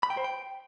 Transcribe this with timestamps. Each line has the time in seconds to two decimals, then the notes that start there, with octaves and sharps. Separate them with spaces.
0.03 B5
0.10 G5
0.17 C5
0.24 G5